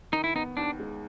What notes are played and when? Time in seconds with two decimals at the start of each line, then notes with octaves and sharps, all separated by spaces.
0.12 D#3 D#4
0.24 E4
0.35 B3 D#4
0.57 D#2 D4
0.79 G#3